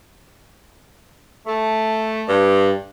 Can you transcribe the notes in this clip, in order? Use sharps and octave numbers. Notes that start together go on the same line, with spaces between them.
A3
G2